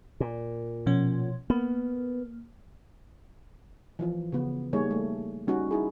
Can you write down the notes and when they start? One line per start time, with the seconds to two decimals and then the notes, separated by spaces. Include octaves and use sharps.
0.20 A#2
0.86 B2 F3 C#4
1.50 A#3 B3
3.99 E3 F3 F4
4.32 C#3 B3
4.73 G3 A#3 D#4 G#4 C#5
4.91 A3
5.48 G3 C#4 D#4 F#4
5.71 D#4 E4 G#4